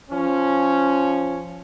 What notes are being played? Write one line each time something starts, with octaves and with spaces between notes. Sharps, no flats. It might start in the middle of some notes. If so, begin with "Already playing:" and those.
F3 C#4